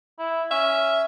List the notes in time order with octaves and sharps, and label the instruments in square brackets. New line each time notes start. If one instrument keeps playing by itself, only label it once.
[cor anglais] E4
[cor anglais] C#4 [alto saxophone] E5